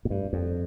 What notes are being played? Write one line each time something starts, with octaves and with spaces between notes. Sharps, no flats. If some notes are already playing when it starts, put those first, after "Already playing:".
A#2
G2
F2